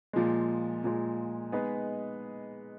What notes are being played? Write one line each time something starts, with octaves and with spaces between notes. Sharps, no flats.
A#2 F3 G#3
A#2 F3 G#3
G#3 B3 D#4 G#4 B4